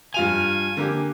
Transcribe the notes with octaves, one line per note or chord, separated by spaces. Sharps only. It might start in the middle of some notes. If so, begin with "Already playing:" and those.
G2 F4 G#5 F7
D3 A#3 G4